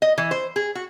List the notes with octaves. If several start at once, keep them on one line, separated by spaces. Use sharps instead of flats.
D#5
E3
C5
G#4
F#4